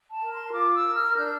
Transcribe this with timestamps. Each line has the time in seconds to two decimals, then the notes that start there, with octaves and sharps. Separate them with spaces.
0.11 A5
0.23 A#4
0.33 C6
0.53 F4 D6
0.74 E6
0.85 A#4
0.96 F6
1.16 D4 G6